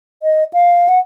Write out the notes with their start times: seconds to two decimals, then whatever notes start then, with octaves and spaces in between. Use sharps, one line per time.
0.23 D#5
0.53 F5
0.88 F#5